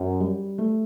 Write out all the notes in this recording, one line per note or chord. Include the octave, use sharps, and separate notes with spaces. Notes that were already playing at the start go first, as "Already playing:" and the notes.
Already playing: F#2
G3
A3